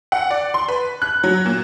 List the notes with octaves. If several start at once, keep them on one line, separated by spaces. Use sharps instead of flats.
F#5
D5
C6
B4
F#6
F#3
A#2